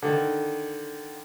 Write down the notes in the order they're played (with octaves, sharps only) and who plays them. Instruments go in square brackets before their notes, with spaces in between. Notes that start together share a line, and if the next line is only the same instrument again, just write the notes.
[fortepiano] D3 D#3